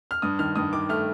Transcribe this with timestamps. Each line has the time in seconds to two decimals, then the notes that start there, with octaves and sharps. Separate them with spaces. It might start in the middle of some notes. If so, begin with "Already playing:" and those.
0.11 F6
0.22 G2 D#6
0.39 D#3 F6
0.56 G2 D#6
0.73 D#3 D6
0.89 A3 F6